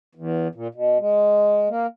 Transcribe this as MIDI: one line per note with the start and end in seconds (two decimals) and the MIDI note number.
0.15 0.48 40
0.55 0.68 46
0.75 0.98 47
0.99 1.69 56
1.69 1.87 58